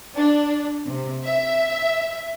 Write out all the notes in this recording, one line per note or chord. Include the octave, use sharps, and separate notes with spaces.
D4
C3
E5